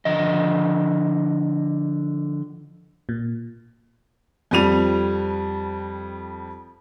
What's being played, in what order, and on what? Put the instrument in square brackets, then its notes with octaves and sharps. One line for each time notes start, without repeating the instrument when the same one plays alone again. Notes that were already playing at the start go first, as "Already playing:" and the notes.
[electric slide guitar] D3 F3 D#5
[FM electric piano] A#2
[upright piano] F2 F3 G3 D#7 F7